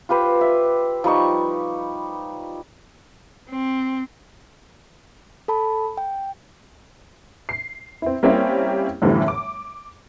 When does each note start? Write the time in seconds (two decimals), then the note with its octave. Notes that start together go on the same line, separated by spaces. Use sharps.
0.09 F4 G4 B4 C5
0.41 E5
1.04 F3 G3 D#4 C#6
3.49 C4
5.48 A4 A5 B5
5.98 G5
7.49 C7
8.02 C4 E4
8.23 G3 A#3 C4 C#4 E4 G4
9.02 F#2 A2 D3 E3 F3 G3
9.28 D6